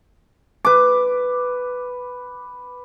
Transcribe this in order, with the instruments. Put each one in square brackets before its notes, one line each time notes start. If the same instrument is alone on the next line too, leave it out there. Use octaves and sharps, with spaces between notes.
[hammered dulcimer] B4 D6